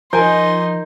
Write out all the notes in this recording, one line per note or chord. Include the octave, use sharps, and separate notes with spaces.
F3 D#4 A#4 G#5 C6 G6